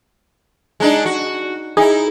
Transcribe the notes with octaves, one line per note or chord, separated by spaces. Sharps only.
G#3 D4 D#4
F#4
D#4 E4 G#4